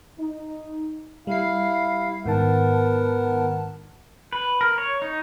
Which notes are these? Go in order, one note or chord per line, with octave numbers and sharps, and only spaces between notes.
D#4
G3 E4 F5 C7
G#2 D#3 B3 A#4 F#5 A5
B4
A#4
C#5
D#4